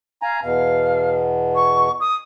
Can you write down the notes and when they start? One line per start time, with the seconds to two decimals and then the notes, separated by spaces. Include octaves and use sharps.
0.22 F5 G#5 A#5
0.43 E2 B2 F5
1.55 C#6
2.00 D#6